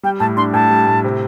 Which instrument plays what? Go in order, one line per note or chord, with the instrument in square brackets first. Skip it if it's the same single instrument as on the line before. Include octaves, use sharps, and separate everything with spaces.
[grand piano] G3 [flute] G5
[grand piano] A2 [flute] A5
[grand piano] D4 [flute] C6
[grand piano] A2 [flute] A5
[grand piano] G3
A2
C3